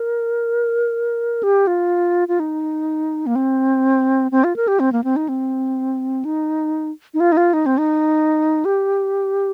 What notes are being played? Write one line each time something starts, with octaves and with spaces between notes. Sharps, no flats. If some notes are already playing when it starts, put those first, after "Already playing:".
Already playing: A#4
G4
F4
F4
D#4
A#3
C4
C4
F4
A#4
G4
C4
A#3
C4
D#4
C4
D#4
D#4
F4
D#4
F4
D#4
C4
D#4
G4